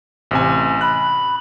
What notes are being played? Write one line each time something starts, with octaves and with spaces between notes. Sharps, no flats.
A1 C3 G#5
B5 F#6